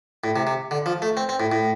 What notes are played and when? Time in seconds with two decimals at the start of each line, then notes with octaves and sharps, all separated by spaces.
0.24 A2
0.36 C3
0.47 C3
0.71 D3
0.86 F3
1.02 A3
1.17 C4
1.29 C4
1.40 A2
1.52 A2